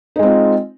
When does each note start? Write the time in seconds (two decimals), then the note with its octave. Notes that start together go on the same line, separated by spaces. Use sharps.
0.16 D#4
0.19 G#3
0.23 C4
0.26 F4